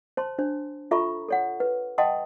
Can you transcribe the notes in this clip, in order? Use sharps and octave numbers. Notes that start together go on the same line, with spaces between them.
C5 A5 C6
D4 C5
F4 A4 E5 A#5 B5 C#6
A4 C#5 F#5
B4
D#5 F#5 G5 A5 C6 D#6